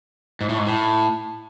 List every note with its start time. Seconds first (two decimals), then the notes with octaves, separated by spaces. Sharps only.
0.41 G#2
0.49 A2
0.58 G#2
0.67 A2